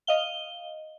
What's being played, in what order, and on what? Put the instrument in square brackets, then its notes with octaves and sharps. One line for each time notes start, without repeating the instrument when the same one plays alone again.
[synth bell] D#5 F5 G7